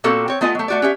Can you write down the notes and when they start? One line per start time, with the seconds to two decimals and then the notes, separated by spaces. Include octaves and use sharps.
0.04 A#2 A#3 C4 F#4 A4
0.28 C4 C#5
0.41 A3 B3 F4 D#5 G#5
0.55 F#3 A3
0.68 A3 F#4 D5
0.82 C#4 G4 D5 E5